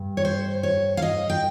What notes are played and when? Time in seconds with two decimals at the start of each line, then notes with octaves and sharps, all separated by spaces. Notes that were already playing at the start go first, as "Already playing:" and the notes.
Already playing: G2
0.17 C#5
0.25 C5
0.63 C#5
0.97 F5
1.02 D#5
1.30 G5